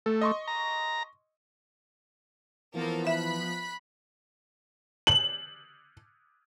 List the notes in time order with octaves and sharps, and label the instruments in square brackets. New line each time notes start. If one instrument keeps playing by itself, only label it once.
[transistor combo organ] A3 [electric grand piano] A4
[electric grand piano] D#5 C6 C#6
[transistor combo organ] A#5
[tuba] E3 [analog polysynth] F3 B3 [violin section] A#3 A4 A#4
[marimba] E5 [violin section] B5 F#6 B6
[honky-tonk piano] F#7